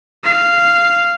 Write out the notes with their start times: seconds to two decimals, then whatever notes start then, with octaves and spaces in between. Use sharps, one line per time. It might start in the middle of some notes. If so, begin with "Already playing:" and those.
0.24 F5